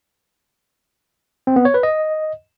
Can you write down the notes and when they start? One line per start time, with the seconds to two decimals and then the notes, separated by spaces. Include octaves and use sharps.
1.47 C4
1.56 B3
1.65 C#5
1.74 B4
1.83 D#5